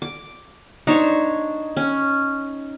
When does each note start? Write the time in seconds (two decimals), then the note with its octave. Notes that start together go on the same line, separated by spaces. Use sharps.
0.02 D6
0.87 D4 D#4 C5 C#5
1.77 C#4